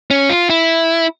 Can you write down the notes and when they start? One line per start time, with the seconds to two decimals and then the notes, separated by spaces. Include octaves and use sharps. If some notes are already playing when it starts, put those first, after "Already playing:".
0.11 C#4
0.30 F4
0.50 E4